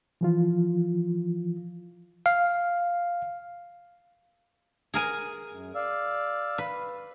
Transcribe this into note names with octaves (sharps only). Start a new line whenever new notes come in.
E3 F3 F4
F5
G#4 A#4 G#5
F#2
D5 F5 E6
B4